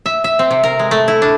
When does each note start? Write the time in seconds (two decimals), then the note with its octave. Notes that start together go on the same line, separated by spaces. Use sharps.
0.06 E5
0.24 E5
0.39 C4
0.51 C3
0.64 A#4
0.79 G#3
0.91 A3
1.08 E4
1.22 D4